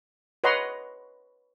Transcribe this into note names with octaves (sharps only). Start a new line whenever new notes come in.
B4 C#5 D#5 F#5 A#5 C6